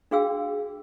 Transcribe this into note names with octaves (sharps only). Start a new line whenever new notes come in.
D4 F#4 G#4 F5 G5 E6